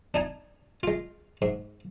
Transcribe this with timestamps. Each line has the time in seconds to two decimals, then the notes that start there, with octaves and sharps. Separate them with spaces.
0.14 D4 D#4 G#5
0.83 G#3 F4
1.42 G#2